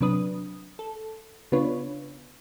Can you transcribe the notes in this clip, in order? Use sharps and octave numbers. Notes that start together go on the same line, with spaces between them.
C3 F#3 D4 B4 D#6
A4
C#3 B3 D4 F4 B4 C#5